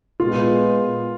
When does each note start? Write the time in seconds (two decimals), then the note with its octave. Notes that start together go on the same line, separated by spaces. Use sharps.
0.20 A#2 G#3 B3 F4